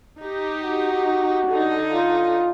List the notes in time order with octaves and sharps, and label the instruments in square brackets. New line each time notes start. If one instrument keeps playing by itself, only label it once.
[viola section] D#4 G4
[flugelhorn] F#4
[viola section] D3 D#4
[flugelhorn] F4